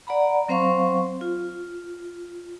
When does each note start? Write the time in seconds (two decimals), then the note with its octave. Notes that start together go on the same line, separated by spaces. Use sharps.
0.07 D5 F#5 A#5 B5
0.48 F#3 C4 C5 F5 C6 C#6
1.21 F4